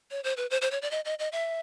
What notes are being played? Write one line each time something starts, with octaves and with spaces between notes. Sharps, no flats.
C#5
C5
B4
C5
C5
C#5
D5
D#5
D#5
D#5
E5